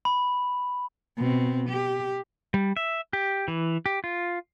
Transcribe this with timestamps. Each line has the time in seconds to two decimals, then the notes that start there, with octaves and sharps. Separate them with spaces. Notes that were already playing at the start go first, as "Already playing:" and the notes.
0.05 B5
1.17 B2 C4
1.69 G4
2.54 G3
2.77 E5
3.13 G4
3.48 E3
3.86 G4
4.04 F4